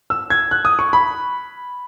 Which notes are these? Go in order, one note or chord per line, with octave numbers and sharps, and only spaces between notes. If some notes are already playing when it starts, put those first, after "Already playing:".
E6
G#6
F#6
D#6
C#6
B5